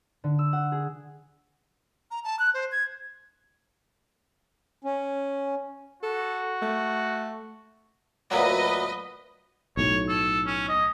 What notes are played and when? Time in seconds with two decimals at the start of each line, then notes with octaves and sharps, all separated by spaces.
0.24 D3
0.39 E6
0.53 F#5
0.72 G#4
2.11 A#5
2.24 A5
2.39 F#6
2.54 C5
2.72 G#6
4.84 C#4
6.03 F#4 A4
6.62 A3
8.31 D2 A#2 F#3 B4 D#5
9.77 B1 A2 C#5
10.09 A4
10.47 C#4
10.69 D#5